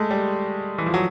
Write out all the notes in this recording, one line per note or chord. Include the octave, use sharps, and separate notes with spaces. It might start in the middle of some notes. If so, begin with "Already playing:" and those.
Already playing: G#3 A3
G3
E3
F3
F#3